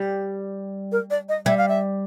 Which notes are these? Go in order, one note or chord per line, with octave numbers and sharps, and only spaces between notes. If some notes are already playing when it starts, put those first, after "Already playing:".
Already playing: G3
A#4
D5
D#5
G3 E5
F5
E5